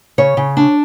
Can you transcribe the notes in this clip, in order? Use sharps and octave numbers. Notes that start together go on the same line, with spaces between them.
C#3 C#5
C#3
D4